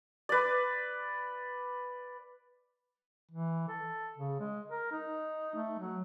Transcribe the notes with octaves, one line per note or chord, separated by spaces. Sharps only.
B4 D5
E3
A4
C#3
G#3
A#4
D#4
A3
F#3